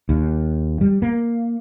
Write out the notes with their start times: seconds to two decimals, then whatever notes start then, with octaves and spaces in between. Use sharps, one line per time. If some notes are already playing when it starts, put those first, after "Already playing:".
0.09 D#2
0.81 G3
1.02 A#3